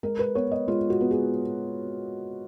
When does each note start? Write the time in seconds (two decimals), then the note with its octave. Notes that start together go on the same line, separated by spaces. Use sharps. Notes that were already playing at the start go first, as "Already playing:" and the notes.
0.03 G#3 A#4
0.19 B4
0.35 B3 C#5
0.52 D#5
0.68 G#3 F4
0.90 F#4
1.01 B3
1.11 G#4